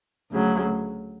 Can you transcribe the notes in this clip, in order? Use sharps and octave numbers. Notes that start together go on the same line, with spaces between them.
D2 C#3 F#3